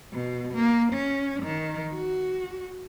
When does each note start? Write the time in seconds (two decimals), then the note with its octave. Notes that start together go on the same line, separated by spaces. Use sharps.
0.13 B2
0.55 A#3
0.93 C#4
1.43 D#3
1.94 F#4